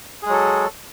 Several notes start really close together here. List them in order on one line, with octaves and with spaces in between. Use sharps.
G#4 G#3 F#3 A4